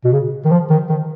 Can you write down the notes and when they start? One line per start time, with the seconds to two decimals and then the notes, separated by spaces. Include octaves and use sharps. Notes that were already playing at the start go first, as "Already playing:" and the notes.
0.04 B2
0.12 C#3
0.45 D#3
0.51 F3
0.70 D#3
0.89 D#3